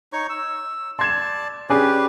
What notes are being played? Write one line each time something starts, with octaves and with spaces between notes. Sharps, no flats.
D#4 C#5 C#6
E6
D5 A5 C6 G#6 E7
C#4 G4 G#4 B4 D5